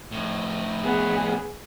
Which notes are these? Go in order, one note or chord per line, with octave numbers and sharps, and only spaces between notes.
F2 A2
B3 G#4